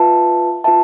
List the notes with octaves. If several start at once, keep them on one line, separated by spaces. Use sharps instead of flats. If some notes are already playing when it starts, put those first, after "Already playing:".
Already playing: F4 B4 E5 A5
F4 B4 E5 A5